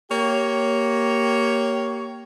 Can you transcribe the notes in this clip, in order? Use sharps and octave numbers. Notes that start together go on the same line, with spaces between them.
A#3 G4 C#5